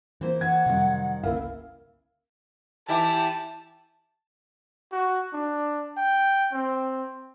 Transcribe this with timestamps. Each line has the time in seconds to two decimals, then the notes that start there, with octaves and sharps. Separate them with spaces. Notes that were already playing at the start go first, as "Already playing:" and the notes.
0.21 E3 A#3 E4 C5
0.41 E3 F#5 G#6
0.66 F2 C3 D#3 F#3 G3
1.24 G1 C#2 C#3 A#3 E4 F5
2.88 E3 E4 G4 A5
4.92 F#4
5.33 D4
5.97 G5
6.52 C4